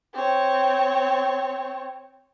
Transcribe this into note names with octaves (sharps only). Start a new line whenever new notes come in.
C4 C#5